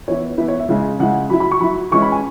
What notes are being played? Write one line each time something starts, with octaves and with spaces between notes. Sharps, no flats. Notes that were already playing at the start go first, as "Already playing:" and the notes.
E3 B3 E4 C#5
E3 B3 E4 B4
C#5
E5
C#3 G#3 E4
C#3 G#3 E4 F#5
F#3 E4 B5
B5
C#6
F#3 E4 B5
E3 G#3 C#4 E4 C#6
B5
G#5